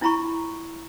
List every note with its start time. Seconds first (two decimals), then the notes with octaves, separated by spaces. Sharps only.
0.01 D4 E4 F4 A#5 B5 C#6